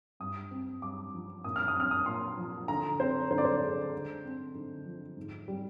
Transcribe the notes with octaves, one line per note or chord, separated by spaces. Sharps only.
G2 D#6
C4
G2 D6
F3
A#2 D#6
F6
D#6
C4 F6
D#6
A#2 C6
F3
D3 A#5
C4 C5
D3 C5
D5
C5
G#3
D3
C4
D3
F3
G#2
G3